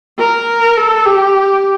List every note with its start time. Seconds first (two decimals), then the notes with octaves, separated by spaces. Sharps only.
0.19 A#4
0.77 A4
1.06 G4